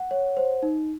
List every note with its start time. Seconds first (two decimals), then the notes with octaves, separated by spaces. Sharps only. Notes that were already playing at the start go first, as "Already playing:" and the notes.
Already playing: F#5
0.11 C#5
0.37 C5
0.63 D#4